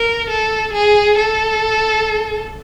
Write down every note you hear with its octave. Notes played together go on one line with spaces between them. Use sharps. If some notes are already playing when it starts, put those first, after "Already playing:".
Already playing: A#4
A4
G#4
A4